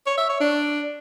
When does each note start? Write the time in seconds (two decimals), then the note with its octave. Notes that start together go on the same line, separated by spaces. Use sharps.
0.06 C#5
0.18 E5
0.29 C#5
0.41 D4